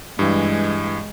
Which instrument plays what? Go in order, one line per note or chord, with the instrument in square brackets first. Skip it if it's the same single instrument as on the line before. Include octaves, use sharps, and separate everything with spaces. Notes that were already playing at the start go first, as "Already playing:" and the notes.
[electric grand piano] G2 E3 [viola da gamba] G#3